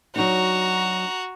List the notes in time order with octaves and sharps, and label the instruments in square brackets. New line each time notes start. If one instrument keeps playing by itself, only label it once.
[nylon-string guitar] F#3 D4 D#4 [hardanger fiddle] F#4 [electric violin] A#5